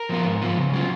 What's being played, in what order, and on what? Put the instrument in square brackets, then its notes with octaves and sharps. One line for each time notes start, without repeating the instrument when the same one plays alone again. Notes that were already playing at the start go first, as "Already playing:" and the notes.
Already playing: [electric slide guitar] A#4
F3 B3 F4
G#2
F3 B3 F4
C#3
F#3 C#4 F4